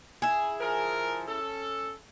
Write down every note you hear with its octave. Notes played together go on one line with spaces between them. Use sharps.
E4 G#4
F3 A#4
C#4 A4